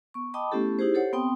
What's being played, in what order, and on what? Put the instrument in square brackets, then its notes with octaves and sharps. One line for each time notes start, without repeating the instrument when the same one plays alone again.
[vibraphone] B3 C#6
D#5 G5 A5 B5 D6 D#6
A3 B3 C#4 E4 G4 A4
D#4 E4 G4 G#4 C5
G4 A4 C5 C#5 F#5
B3 C4 G5 C6 D#6